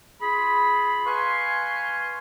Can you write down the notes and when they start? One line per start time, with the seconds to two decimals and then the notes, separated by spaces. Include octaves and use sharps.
0.21 F4 G#4 B5
1.05 B4 F5 G#5 C6 C#6